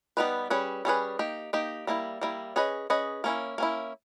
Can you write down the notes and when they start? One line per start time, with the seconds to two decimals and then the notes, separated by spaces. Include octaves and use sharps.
0.17 G3 B3 D#4 G4 B4
0.50 G3 C#4 G#4 B4
0.85 G3 C#4 G#4 B4
1.19 A#3 D#4 G4
1.53 A#3 D#4 G4
1.87 G3 A#3 E4
2.21 G3 A#3 E4
2.56 C#4 G#4 B4 D#5
2.90 C#4 G#4 B4 D#5
3.24 A#3 C#4 E4
3.58 A#3 C#4 E4